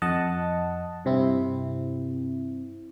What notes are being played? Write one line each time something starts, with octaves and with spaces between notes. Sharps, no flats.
F2 D#5 F#5 A5
G2 C3 C4 E4